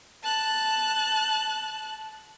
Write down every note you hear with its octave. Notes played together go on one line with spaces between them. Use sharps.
A5 F#6